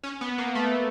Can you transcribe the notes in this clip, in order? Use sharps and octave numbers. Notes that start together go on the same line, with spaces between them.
C#4
B3
A#3
A3